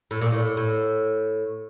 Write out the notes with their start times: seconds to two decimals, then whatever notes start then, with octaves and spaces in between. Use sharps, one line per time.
0.11 A2
0.21 A#2
0.32 A2
0.57 A2